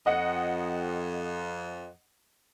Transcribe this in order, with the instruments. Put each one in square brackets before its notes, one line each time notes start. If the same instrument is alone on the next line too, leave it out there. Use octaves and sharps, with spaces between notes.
[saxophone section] F2 [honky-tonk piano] D#5 F#5